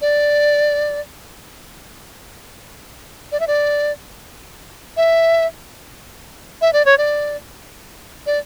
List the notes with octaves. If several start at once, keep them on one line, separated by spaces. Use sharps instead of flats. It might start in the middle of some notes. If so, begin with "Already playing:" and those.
D5
D5
E5
D5
E5
E5
D5
C#5
D5
D5